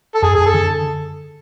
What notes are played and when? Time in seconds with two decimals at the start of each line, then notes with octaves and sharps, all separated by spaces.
0.15 A4
0.22 F#2 G#4
0.35 F#2 G#4
0.46 A4
0.54 D3